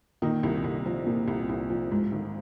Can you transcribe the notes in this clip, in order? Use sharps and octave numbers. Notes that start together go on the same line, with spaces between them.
A#2 D#3 D#4
C2
C2
F3
A#2
C2
C2
F3
G#2
G#1